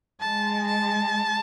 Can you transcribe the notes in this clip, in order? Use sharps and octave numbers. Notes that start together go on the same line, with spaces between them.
G#3 A5
A5